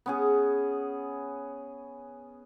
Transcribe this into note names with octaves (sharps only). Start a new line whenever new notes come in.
B3 C#4 G#4